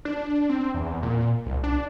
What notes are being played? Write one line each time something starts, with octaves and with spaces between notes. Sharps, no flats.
D4
C4
E2
A#2
C2
D4